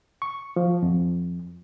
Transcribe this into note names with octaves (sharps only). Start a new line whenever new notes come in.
C#6
F3
F2